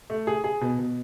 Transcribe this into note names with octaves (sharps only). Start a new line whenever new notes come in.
A3
G#4
G#4
B2
B2